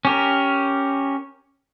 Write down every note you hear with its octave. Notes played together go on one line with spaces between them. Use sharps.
C#4 G4 A#4